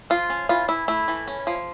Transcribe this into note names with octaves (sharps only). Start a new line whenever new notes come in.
F3 F4
C#4
E3 F4
E3 E4
A3 E4
E3
C#4
F3